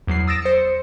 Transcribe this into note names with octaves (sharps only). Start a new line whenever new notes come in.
E2 F#3 C7
D#6 E6 A6 A#6 D7 E7
C5 C#7